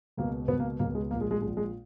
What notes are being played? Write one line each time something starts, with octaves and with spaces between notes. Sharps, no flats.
C#2 B2 A#3
C#2 B2 B3
A#3
C#2 B2 A#3
G#3
A#1 A#2 A#3
G#3
G#3
A#1 A#2 G#3
G#3